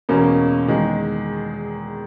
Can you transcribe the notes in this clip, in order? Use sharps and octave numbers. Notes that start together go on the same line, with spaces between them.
E2 B2 A#3 C#4
E2 D#3 G#3